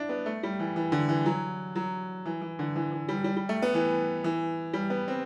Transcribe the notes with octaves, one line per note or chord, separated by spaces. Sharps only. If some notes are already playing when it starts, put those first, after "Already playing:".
Already playing: D4 E4
B3
A3
G3
E3
E3
D3
E3
F#3
F#3
E3
E3
D3
E3
E3
G3
G3
G3
A3
B3
E3
E3
G3
B3
C4